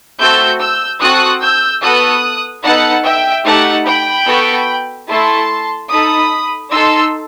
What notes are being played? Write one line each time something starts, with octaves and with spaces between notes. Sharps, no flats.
A3 C4 F#4 A4 E6 G6
E6 G6
C4 F#4 A4 D#6 F#6
E6 G6
B3 F#4 A4 D#6 F#6
B3 D#4 A4 F#5 A5
E5 G5
A3 D#4 G4 F#5 A5
G5 B5
B3 F#4 A4
A3 E4 A4 A5 C6
D#4 A4 B5 D#6
D#4 A4 C6 E6